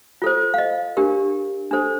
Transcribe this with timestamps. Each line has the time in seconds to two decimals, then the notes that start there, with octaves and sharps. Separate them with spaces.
0.22 F4 A4 C5
0.54 F5
0.58 D#5
0.97 D4 G4 A#4
1.71 D4 A4 C5